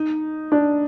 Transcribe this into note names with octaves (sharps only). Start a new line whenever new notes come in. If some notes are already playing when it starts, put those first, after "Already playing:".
Already playing: D#4
D4